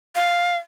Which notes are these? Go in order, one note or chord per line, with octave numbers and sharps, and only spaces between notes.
F5